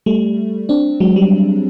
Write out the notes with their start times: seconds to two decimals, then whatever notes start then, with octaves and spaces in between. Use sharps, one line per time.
0.06 G3 A3
0.69 C4 D4
1.00 F#3 G#3
1.16 G3